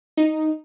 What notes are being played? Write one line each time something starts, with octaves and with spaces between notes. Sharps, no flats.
D#4